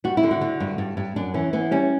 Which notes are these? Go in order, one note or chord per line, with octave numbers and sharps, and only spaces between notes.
G3 F#4
E4
D3
F#4
D3
G2
G2
G2
F#2 D4
E3 C#4
E3 B3
G3 C#4